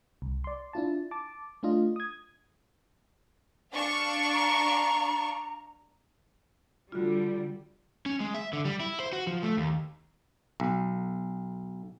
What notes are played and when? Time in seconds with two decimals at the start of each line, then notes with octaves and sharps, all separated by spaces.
0.22 C2
0.44 D5 C6
0.73 D4 E4 F4 A5
1.11 A5 D6
1.63 A3 D4 F4 D#5
1.96 D#6 G#6
3.73 D4 F5 C#6
4.34 A#5
6.92 D3 G3 F4 F#4
8.06 C#4
8.20 G#3
8.34 E5
8.53 D3
8.65 G3
8.80 E4
9.00 C5
9.13 F#4
9.27 F3
9.43 A3
9.57 D#2
10.60 B1